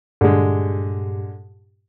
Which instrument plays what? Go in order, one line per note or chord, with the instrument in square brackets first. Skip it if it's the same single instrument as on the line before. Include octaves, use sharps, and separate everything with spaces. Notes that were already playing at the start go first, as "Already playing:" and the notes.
[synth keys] G2 A#2 G4 [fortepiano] D3 G#3